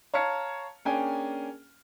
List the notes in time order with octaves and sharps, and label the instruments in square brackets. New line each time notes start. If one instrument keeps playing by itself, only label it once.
[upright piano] C#5 F5 A5 A#5 F6 C#7
A#3 C#4 D4 G#4 G5 G#5